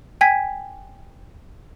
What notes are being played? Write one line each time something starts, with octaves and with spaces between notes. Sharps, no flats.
G5 G#5 G#6 B6